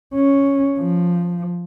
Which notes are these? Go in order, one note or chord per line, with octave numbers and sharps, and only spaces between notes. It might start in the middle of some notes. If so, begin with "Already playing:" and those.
C#4
F3